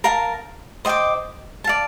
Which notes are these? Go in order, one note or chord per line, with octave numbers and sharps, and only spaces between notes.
A#4 F5 A5
C5 D#5 G5 D6
D5 F5 A5